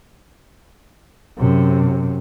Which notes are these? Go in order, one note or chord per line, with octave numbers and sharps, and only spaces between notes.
F#2 C3